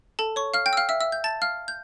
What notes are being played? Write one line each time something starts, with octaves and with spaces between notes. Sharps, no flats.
A4 A5
C#5 C#6
F5 F6
G5 G6
E6
F5 F6
E5 E6
E5 E6
G6
A5 A6
F5 F6
G6